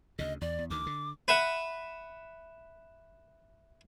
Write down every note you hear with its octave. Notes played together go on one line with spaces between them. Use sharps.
D2 C#3 D#5
E2 D5
E2
D2 D#3 D6
D3
B4 E5 F#5